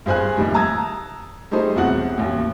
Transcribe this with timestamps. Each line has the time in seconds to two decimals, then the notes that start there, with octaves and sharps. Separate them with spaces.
0.06 G2 G#4 C5 G#5 F#6
0.37 A#1 D#2 A2 D#3 G3
0.54 A5 A#5 D#6 E6 G#6
1.51 G3 A3 D#4 G#4 C5
1.75 E1 C2 C3 F#4 F#5 F#6
2.18 A1 D#2